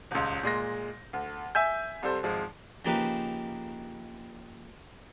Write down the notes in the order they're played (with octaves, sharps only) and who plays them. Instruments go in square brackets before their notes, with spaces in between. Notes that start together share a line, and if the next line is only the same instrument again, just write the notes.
[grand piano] D#1 C#2
A#2 G#3 C6 A#6
D2
E5 G#5 G6
C2 G3 A4 C5
G#1 F3 G#3
[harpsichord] C#3 F3 A#3 D#4 G4 B4